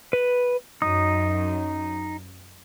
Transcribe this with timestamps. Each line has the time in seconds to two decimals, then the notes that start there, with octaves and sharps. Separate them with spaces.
0.13 B4
0.82 F#2 D#4 D#6